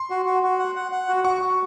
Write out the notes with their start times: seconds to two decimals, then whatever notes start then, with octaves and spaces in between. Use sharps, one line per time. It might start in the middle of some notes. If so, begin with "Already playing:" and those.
Already playing: C6
0.10 F#4
0.26 F#4
0.43 F#4
0.59 F#5
0.75 F#5
0.92 F#5
1.09 F#4
1.24 F#4 C#6
1.41 F#4